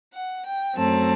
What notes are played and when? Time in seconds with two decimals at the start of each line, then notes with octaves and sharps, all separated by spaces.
0.12 F#5
0.44 G5
0.76 F#2 F#3 A3 C4 A5